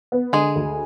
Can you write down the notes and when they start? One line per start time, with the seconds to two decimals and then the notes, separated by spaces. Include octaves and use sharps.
0.12 B3
0.33 D3 G#3 G#4
0.56 D2